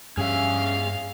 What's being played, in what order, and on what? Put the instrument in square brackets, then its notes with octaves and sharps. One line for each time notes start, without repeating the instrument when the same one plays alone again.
[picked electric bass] G2 G3 [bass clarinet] C#4 [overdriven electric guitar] G#4 E5 [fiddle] F5